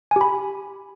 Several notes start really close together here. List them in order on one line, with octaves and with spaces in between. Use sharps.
G#5 G4 B5